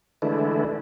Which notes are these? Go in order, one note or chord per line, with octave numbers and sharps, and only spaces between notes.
D3 E3 G#3 A3 D4 E4